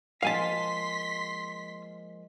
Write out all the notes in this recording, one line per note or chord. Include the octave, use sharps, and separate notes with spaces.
F3 G#3 A#3 F5 G#5 A5 C6 B6